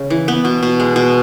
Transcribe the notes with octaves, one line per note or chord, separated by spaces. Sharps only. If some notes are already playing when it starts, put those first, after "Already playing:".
Already playing: C#3
E3
B3
B2
B2
G#3
B2